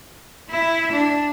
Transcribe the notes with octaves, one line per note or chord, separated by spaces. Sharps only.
E4 E5
D4